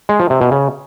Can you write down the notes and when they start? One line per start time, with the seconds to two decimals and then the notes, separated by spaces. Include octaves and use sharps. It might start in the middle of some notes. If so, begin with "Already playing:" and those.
0.09 G#3
0.20 F3
0.30 C3
0.41 B2
0.51 C#3